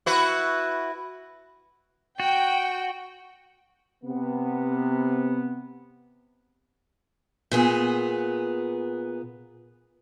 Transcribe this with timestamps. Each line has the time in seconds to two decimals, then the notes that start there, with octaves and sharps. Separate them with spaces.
0.06 E4 F#4 B4
2.20 F#4 G5
4.04 C3 B3
7.51 A#2 B3 G#4